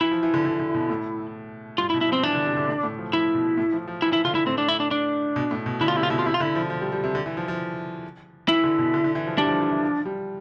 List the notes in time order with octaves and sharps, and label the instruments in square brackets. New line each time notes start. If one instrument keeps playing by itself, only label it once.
[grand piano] E3 [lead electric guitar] E4
[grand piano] F3
E3
D3
D3
D3
B2
A2
[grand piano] G2 [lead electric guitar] F4
[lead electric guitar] E4
[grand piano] B2
[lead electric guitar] E4
[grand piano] F3
[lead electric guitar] C4
[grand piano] E3 [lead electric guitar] D4
[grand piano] D3
C3
D3
A2
A2
F3
[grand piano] F3 [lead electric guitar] E4
[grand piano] B2
A2
F3
F3
[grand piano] E3 [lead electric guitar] E4
[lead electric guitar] E4
[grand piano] D3 [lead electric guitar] F4
[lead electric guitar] E4
[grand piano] A2 [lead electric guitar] C4
[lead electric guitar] D4
E4
D4
D4
[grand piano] B2
A2
B2
[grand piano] D3 [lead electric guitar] E4
[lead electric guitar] F4
[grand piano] C3 [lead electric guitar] E4
[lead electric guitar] F4
[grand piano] B2 [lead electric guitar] E4
[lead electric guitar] F4
[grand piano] C3 [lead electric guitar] E4
[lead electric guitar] F4
[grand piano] D3 [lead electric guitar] E4
[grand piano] F3
F3
G3
G3
C3
D3
E3
F3
F3
[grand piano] E3 [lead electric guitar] E4
[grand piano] D3
B2
D3
D3
E3
F3
[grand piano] G3 [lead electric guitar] D4
[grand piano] E3
F3
E3
E3
F3
G3